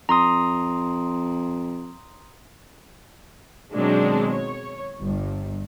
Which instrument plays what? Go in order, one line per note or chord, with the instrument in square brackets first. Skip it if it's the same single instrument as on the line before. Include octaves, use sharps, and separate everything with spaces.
[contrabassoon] F2 [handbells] A#5 C6 D#6
[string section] B2 D#3 F#3 G#3 C4 D4
C#5
G1 G2